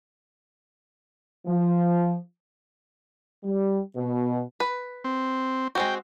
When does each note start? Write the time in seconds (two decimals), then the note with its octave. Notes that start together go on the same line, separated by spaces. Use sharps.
1.47 F3
3.44 G3
3.96 B2
4.60 B4
5.04 C4
5.75 G#3 C4 F#4 G5